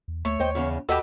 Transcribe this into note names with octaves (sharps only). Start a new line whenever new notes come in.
E2
D2 A3 C#5
D#2 C5 D#5 G5
E2 C#3 C#4
D#2 F#4 G4 A4 B4 D#5 E6